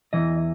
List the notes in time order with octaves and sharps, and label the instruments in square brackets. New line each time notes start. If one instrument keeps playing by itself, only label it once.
[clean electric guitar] E2 C#3 E3 D#5